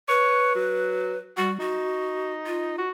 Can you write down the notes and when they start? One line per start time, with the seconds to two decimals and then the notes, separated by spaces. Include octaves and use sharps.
0.09 B4 C#5
0.56 F#3
1.38 G3 F#4
1.60 D#4 F#4
2.46 F4
2.78 F#4